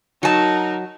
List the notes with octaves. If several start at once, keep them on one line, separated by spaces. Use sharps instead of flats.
F#3 D#4 A#4 A5